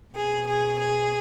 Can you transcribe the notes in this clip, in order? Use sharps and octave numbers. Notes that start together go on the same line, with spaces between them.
B2 G#4
G#4
G#4